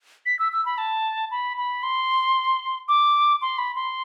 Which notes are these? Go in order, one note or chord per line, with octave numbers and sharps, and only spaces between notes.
B6
E6
E6
B5
A5
B5
B5
C6
D6
C6
B5
C6